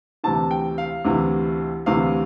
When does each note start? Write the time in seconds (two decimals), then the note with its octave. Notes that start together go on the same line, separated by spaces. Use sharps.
0.24 D2 C3 E3 A5
0.51 G5
0.78 F5
1.05 D2 C3 E3
1.86 D2 C3 E3 F5